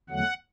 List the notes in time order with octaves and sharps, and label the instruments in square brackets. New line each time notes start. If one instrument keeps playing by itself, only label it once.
[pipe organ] E2 D3 F#3 A3 F#5